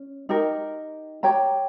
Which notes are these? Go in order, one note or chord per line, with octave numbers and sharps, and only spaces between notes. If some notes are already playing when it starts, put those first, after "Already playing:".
Already playing: C#4
D#4 G4 A#4
G4 C#5 G5 A#5